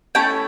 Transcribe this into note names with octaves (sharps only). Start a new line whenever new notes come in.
A3 C#4 E4 G5 A5